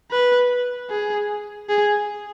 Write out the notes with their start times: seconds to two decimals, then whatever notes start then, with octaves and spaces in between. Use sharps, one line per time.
0.11 B4
0.90 G#4
1.69 G#4